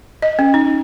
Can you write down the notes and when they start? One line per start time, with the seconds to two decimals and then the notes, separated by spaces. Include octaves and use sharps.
0.22 D#5
0.39 C#4
0.54 D#4